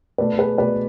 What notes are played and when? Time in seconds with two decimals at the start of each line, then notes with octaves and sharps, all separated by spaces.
0.18 B2 A3 B4 D5
0.38 G#4 B4
0.58 B2 A3 B4 D5